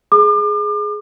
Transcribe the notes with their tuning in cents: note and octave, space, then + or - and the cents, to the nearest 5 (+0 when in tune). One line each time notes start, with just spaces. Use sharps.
G#4 +10 D6 +40